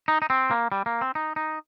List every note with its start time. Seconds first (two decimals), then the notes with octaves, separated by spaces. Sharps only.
0.08 D#4
0.22 D#4
0.30 C4
0.51 A#3
0.72 G3
0.86 A#3
1.01 C4
1.15 D#4
1.36 D#4